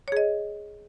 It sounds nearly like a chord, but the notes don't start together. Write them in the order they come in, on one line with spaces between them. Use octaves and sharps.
C#5 G#4 D#5